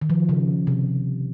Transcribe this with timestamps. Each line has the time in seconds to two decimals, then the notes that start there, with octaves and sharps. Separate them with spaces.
0.02 D#3
0.10 F3
0.29 C#3
0.67 C3